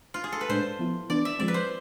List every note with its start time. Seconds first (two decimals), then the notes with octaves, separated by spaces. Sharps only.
0.14 F4
0.24 G#4
0.32 A4
0.41 B4
0.49 A2 G#3 D4 C5
0.79 F3 B3 E4
1.10 E3 B3 D4 D5
1.25 E5
1.39 F3 G#3 C4 D5
1.48 B4
1.54 C5